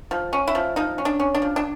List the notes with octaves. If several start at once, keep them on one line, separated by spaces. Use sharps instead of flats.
F3
C#4
E4
F3
F3 D#4
C#4
D4
C#4
D4
F3
D4